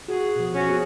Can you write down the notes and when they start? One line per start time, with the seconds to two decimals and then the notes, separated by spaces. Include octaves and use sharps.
0.08 F#4 G#4
0.36 B2 F3
0.55 C#4 F#4
0.68 B3 G#4